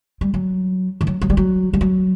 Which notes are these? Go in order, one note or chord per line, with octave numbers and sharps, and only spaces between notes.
G3
F#3
E3
F#3
F#3
G3
F#3
G3
F#3